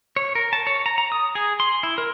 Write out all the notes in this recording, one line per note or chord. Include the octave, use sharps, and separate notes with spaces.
C#5
A#4
A5
C#5
A#5
A#5
D#6
G#4
C6
E4
A#4